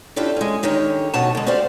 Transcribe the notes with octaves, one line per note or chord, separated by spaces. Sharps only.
C#4 D4 E4 F4 G4 A4
G#3 C#4
D3 D#3 G4 C#5
F#2 B2 F#4 C#5 A5
D3 G#3
F#4 G4 C5 D5 F5